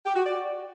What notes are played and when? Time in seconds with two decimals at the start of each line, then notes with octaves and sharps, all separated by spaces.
0.05 G4
0.15 F#4
0.25 D5